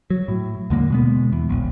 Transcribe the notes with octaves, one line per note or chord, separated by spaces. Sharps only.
F#3
A2
D#2 D3 G#3 A#3
B2 G#3 B3
E2
D#1 A#1